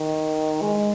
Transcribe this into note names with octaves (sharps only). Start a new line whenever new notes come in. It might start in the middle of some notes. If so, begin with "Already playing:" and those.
Already playing: D#3
G#3